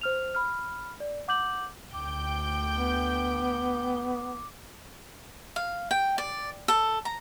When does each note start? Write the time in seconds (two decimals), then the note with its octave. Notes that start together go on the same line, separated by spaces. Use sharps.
0.01 C5 F6 F7
0.35 B5 F6
1.00 D5
1.28 F#5 D6 G6 F#7
1.93 D2 G5 D6 G6
2.77 B3
5.56 F5
5.91 G5
6.18 D5
6.68 A4
7.05 A#5